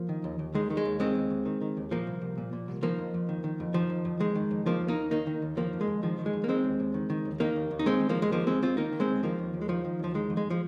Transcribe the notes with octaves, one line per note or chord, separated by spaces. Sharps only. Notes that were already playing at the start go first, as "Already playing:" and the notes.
Already playing: F3 A#3
D#3
D#2
D#2
D#3 G#3
D#3
G#3
D#2
D#3 G#3 C4
D#2
D#2
D#3
D#3
D#2
A#2 F3 A#3
C2
C2
A#2
A#2
C2
D#3 F3 A#3
F2
F2
D#3
D#3
F2
D#3 F3
F2
F2
D#3 G#3
D#3
F2
D#3 F3 A#3
D#2
A#3 D#4
D#2
D#3 A#3 D#4
D#3
D#2
D#3 F3 A#3
F2
G#3
F2
D#3 F3
D#3
G#3
F2
A#3
D#3 G#3 C4
D#2
D#2
D#3
D#3
D#2
D#3 A#3 D#4
D#2
D#2
D#4
D#3 G#3 C4
D#3
F3 A#3
D#2
G#3
D#3 F3 A#3
D#2 G#3 C4
D#2 C4 F4
D#3 A#3 D#4
D#3
G#3 C4
D#2
D#3 F3 A#3
D#2
D#2
G#3
D#3 F3
D#3
D#2 F3
D#3 G#3
F2
G#3
F3